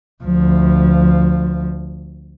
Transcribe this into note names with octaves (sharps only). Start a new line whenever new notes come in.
D2 F3